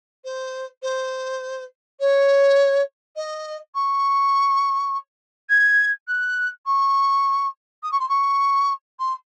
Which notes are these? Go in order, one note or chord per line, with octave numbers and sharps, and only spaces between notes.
C5
C5
C#5
D#5
C#6
G#6
F#6
C#6
D#6
C#6
C6
C#6
C6